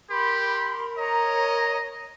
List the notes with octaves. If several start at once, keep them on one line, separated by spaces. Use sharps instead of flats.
G4 A#4 B5 C6
C#5 D#5 A#5